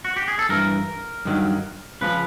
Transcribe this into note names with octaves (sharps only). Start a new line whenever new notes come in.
F#4
G4
G#4
A4
G2 E3 A#4
G2 D#3 F#3
C#2 C#3 F3 B4